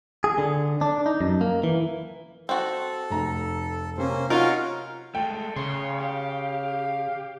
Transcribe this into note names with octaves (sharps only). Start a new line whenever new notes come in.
G#4
D3
D4
D#4
F#2
A#3
E3
C4 F#4 A4
F1 A#5
C3 A#3 C#4 C5
C#4 D#4 F4 F#4 A#4
G#3 A3 A4 G5
C#3 C#5 C6
G4 F5